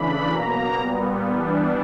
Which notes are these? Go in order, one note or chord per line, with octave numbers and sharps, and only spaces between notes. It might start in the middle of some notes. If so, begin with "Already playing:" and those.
Already playing: C#3 E3 A3 D4 B5
B2 F#3 A#3 A#5
A#2 G3 B3
E3 G3 B3 D4